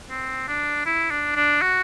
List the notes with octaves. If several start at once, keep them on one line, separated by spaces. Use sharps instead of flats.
C4
D4
E4
D4
D4
F#4